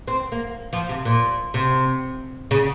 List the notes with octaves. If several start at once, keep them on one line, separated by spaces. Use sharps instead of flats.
C4
A#3
F3
C3
A#2
C3
C#3